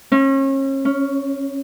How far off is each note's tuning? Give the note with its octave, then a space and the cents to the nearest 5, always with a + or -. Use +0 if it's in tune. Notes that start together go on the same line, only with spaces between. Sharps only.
C#4 -35
C#4 +10